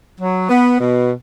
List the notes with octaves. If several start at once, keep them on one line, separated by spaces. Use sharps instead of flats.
F#3
B3
B2